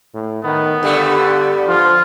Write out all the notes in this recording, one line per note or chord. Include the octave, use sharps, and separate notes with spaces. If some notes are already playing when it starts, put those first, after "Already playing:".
A2
D#3 B3
G2 D3 G3 A3
F3 F4